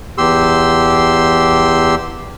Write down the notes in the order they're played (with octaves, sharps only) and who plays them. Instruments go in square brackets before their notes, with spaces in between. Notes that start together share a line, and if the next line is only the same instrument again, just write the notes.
[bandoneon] E2 G4 C6 E6